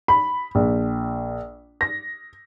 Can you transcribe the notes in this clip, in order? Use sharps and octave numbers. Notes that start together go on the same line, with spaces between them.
B5
A#1
A#6